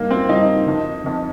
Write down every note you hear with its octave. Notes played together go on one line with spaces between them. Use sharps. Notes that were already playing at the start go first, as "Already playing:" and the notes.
Already playing: G2 D#3 A#3
C4
G2 D#3 D#4
F2 D#3
F2 D#3